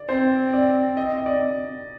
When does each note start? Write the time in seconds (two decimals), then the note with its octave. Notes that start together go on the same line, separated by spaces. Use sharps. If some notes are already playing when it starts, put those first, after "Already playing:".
Already playing: D5
0.09 C4 C5
0.54 D5
0.97 D#5
1.17 D#5
1.26 D5